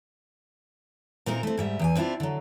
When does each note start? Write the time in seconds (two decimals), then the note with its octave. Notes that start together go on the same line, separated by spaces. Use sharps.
1.26 A#2 A#3 C4 D#4 E4 A#4
1.43 A3 C4
1.57 G#2 G3 E5
1.79 E2 G5 G#5
1.95 C4 D4 E4 F4 D5
2.20 D3 F#3